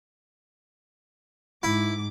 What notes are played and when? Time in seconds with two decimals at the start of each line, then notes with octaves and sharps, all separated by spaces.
1.63 G#2 E4 D6